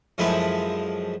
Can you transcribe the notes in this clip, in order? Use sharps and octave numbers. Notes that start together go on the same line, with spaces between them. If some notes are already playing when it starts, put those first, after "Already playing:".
F#2 F3 G#3 E4 A4 B5